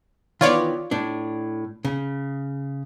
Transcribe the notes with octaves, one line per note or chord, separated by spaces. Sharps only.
D#3 E3 B3 F4 C#5 D5
A2 D4
C#3